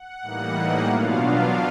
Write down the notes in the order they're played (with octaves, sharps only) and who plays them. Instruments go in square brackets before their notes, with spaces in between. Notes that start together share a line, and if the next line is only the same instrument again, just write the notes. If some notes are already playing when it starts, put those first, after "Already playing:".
Already playing: [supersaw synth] F#5
A2 E3 G3 A#3 D#4
B2 F#3 B3 D4 F4 F5
F5